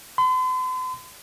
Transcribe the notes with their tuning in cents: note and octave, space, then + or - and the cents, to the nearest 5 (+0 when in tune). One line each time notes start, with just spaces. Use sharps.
C6 -45